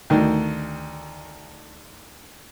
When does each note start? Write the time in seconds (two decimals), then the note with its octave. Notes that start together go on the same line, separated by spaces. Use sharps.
0.10 D2 D#3